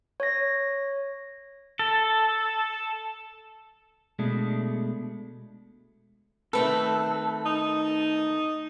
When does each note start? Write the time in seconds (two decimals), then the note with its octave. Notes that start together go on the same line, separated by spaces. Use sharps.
0.20 C#5 A#6
1.79 A4
4.19 B2 G#3 A3 D4
6.53 D#3 A3 C4 A4 B4
7.46 D#4